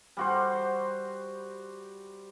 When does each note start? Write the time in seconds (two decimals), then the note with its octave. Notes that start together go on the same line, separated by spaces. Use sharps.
0.17 G3 F#4 C5